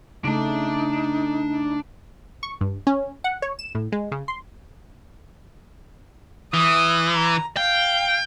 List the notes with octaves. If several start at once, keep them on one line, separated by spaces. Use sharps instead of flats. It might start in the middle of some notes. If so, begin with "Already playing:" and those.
C#3 A3 D4 D#4 A5
C#6
G2
C#4
F#5
C#5
E7
A2
G#3
C#3
C6
E3 D#6
A#5
F5 G5